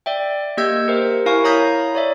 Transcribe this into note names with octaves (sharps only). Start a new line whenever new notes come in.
D5 E5 G5
A#3 G4 D#5 E6 G6 G#6
G4 A#4 C5 E5
E4 A#4 F5 G#5 C#6
E4 C#5 A#5 D#6 G6 B6
C#5 D5 E5